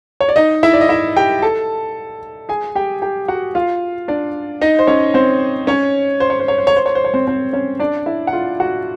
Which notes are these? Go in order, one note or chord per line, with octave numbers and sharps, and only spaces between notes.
C#5
D5
D#4 D#5
E4 E5
D5
D#5
E4 E5
G4 G5
A4 A5
G#4 G#5
G4 G5
G4 G5
F#4 F#5
F4 F5
D4 D5
D#4 D#5
C5
C#4 C#5
C4 C5
C#4 C#5
C5
C#5
C5
C#5
C5
C#5
C5
C#5
C5
C#5
C4 C5
C4 C5
C#4 C#5
D4 D5
E4 E5
F#5
F4 F5
F#4 F#5